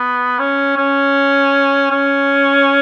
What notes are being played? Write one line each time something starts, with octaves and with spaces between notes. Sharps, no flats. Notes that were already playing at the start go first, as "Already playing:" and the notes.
Already playing: B3
C#4
C#4
C#4